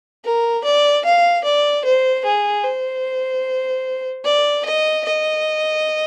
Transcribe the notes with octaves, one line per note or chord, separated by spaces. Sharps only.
A#4
D5
F5
D5
C5
G#4
C5
D5
D#5
D#5